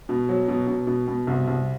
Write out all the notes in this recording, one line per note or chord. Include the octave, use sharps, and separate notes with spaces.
B2
F#3
B2
B2
B2
B2
C2
C2